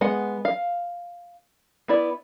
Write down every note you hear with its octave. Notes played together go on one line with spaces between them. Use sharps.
G#3 B3 F#5
F5
B3 E4 D5